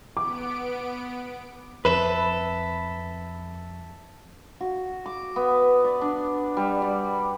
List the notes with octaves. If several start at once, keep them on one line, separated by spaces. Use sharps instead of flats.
B3 D6 D7
F2 A4 B4 E5
F#4
D6
B3
D5
D4
G3
D5